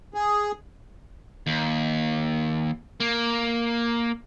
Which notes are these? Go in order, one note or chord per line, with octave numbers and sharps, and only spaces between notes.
G#4
D#2
A#3